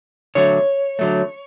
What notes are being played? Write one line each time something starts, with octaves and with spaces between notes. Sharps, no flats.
D3 F#3 A3 C#5
D3 F#3 A3